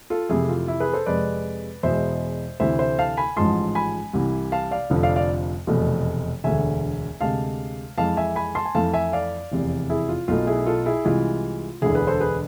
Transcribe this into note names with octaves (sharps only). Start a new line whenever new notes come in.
F4 A4
F2 C3 E3 A3 E4 G#4
F4
E4
G#4 B4
A4 C5
F2 C3 G#3 B4 D5
E2 B2 G#3 C5 E5
D2 C3 E3 A3 C5 E5
C5 E5
F5 A5
G#5 B5
A1 G#2 F3 G#3 A5 C6
G#5 B5
C2 C3 E3
F5 A5
D5 F5
F1 F2 D3 F3
D5 F5
D5 F5
F1 E2 B2 A3
E1 D2 D3 E5 G#5
D2 C3 G#3 F5 A5
F2 E3 G#3 F5 A5
E5 G#5
G#5 B5
A5 C6
G#5
F2 E3 A3 F5 A5
E5 G#5
D5 F5
F1 E2 C3
E4 G#4
F4
B1 B2 A3 F4
E4 G#4
F4 A4
E4 G#4
C2 C3 E3 G#3 F4
E1 D2 D3 E4 G#4
G#4 B4
A4 C5
G#4 B4